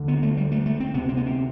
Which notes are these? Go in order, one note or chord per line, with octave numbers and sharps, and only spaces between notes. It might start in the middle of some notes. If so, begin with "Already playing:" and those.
Already playing: D2 D3
B3
A3
G3
A3
A3
C4
D2 C3 B3
C4
B3
C4